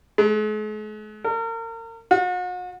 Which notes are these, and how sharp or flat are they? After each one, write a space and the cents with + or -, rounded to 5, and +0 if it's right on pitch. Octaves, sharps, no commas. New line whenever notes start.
G#3 +45
A#4 -35
F#4 -40